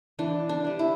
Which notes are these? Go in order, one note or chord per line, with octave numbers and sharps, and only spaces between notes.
E3 D4
D4
G3 D4
E4